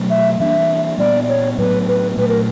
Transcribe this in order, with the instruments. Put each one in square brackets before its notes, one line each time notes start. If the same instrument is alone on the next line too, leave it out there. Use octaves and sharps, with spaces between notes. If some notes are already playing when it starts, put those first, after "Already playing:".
Already playing: [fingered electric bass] B2 F#3 A3
[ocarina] E5
[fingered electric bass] E3 G3 A#3 D4 [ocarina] E5
[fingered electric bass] A#2 G3 B3 [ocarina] D5
[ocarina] C#5
[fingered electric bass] A2 F#3 B3 [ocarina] B4
[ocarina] B4
[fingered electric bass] A#2 F#3 A3 [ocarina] B4
[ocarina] A#4